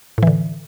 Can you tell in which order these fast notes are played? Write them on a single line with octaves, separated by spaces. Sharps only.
A2 E3 D3